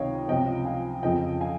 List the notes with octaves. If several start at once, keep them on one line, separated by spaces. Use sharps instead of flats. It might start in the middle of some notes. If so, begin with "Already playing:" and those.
Already playing: C#2 C3 D#3 C#5 D#5 F5 G5
C#2 C3 F3 D#5 G5
F5 G#5
F2 C#3 F3 D#5 G5
F5 G#5